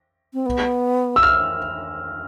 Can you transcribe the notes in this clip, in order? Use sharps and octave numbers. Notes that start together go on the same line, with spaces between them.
C4
B3
E6
F6